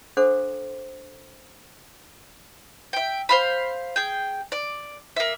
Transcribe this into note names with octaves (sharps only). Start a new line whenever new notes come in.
D4 A4 C5 F#5 C6 D6
E5 G5
C5 F5 B5
G#4 G5
D5
A#3 E5